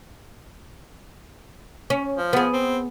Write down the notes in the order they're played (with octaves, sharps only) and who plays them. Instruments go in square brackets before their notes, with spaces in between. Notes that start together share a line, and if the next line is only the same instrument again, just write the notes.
[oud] C#4
[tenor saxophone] F3
[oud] B3 G#4
[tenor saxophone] C4